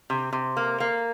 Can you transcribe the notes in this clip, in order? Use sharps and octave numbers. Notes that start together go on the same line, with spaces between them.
C3
C3
A#3
A#3